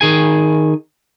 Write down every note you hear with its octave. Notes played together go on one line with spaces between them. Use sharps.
D#3 G#4 G#5